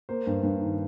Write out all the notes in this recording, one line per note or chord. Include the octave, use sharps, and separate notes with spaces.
A#3 C5
G2
G2
D#3